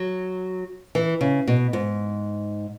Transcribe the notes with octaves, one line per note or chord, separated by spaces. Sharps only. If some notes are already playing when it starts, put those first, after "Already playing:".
Already playing: F#3
E3
C#3
B2
G#2